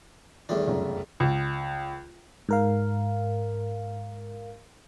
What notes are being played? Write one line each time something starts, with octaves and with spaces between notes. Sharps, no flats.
E2 A2 D#3 G3 D4
F1 C#2 F#2
C#2
G#2 A#4 F5